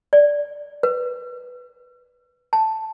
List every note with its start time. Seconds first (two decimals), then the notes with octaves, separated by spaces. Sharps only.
0.13 D5
0.83 B4
2.53 A5